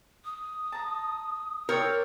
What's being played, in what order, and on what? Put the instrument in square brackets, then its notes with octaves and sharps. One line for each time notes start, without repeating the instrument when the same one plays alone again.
[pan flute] D#6
[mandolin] A5 A#5
[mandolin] C4 C#5 D5 [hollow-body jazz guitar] A#4